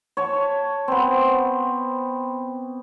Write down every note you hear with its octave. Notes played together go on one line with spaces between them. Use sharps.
C#5 A5
B3 C4